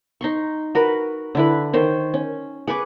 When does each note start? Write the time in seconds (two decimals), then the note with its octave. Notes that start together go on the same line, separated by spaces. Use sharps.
0.21 D#4 C6 C#6
0.75 F#4 A#4 B4
1.35 D3 E4 B4
1.73 D#3 C5 C#5
2.14 C#4
2.67 G#4 B4 C#6 D6